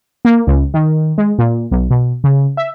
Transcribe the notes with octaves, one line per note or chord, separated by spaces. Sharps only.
A#3
C#2
D#3
G#3
A#2
B1
B2
C#3
E5